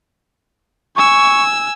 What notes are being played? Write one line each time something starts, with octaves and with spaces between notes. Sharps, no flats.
G#5 C#6 E6